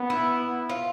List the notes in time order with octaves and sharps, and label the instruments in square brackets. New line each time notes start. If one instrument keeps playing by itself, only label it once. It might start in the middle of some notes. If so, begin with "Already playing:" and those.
Already playing: [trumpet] B3
[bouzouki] E4
F4